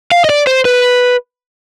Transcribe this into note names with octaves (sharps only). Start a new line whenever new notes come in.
F5
D#5
D5
C5
B4